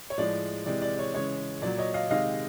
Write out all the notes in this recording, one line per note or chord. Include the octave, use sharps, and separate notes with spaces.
C#5
A2 F3 G#3 D5
C3 E3 G#3 D5
D5
C#5
C#3 E3 G#3 C#5
A#2 F#3 D5
C#5 D#5
D#5 F5
C3 D#3 G#3 D#5 F5